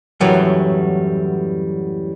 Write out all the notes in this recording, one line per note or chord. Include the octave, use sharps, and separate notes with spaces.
F#2 A2 E3 F#3 G3